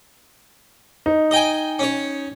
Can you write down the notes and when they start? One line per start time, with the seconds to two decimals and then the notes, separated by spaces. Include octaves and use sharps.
1.06 D#4
1.31 D#5 G5 G#5
1.79 C#4 C#5